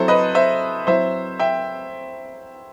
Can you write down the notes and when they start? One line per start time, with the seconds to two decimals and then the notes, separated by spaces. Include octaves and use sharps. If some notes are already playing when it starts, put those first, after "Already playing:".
Already playing: F#3 C4 E4 A4 C5
0.08 B4 D#5
0.35 C5 E5
0.87 F#3 C4 E4 C5 E5
1.40 E5 G5